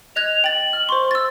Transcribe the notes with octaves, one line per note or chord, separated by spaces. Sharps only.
D#5 F#6 G#6 F7
G5 A6 F#7
F6
C5 C6 C#6
E6 A6